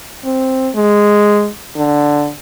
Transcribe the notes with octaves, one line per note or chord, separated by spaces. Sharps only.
C4
G#3
D3